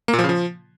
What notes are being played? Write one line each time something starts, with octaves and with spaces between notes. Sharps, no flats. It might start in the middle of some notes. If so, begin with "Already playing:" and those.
A#3
A#2
F3
C#3
F3